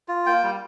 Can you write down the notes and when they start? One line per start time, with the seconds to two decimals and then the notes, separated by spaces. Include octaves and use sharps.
0.08 F4
0.26 A#3 G5
0.43 G3